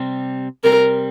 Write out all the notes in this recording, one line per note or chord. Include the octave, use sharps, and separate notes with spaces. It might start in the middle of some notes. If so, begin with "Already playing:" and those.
Already playing: C3 G3 C4
C3 G3 C4 A#4